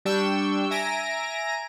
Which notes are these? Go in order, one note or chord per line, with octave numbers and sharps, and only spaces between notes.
G3 D4 G5 C#6 E6
E5 G#5 A#5 A#6 D7